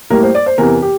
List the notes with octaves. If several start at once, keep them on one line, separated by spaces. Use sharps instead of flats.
A2 G3 A#3 A#4
C5
D5
C5
E2 C3 E3 A#4
G4